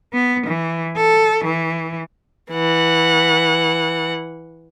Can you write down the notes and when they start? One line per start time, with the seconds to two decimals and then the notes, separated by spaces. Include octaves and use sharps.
0.12 B3
0.47 E3
0.96 A4
1.44 E3
2.52 E3 F#5